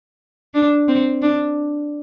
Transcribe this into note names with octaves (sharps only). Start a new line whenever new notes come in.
D4
C4
D4